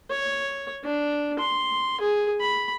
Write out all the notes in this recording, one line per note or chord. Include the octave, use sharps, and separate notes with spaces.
C#5
D4
C6
G#4
B5